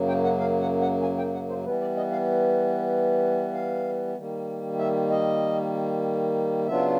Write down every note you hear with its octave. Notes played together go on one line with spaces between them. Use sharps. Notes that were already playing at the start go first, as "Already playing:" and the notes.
Already playing: F#2 C#3 F#3 A#3
G5
F#5
F5
F#5
F#5
G#5
G5
F#5
C5
E3 G3 B3 B4
D5
D#5
F5
F5
D#3 G3 A#3
E5
D#5
C#3 F#3 B3 D4 F4 E5